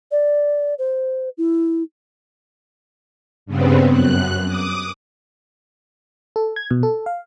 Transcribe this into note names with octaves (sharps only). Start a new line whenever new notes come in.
D5
C5
E4
G2 C#3 B3 C4
F#2 F#6
D6 D#6
A4
G#6
B2
A4
F5